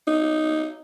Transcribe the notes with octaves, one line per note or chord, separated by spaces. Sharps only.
D#4